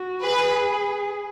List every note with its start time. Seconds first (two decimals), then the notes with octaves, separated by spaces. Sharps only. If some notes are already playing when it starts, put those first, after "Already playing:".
Already playing: F#4
0.23 G#4 B4